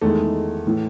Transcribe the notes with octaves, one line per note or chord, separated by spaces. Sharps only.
E2 D#3 G#3 A3
A2 E3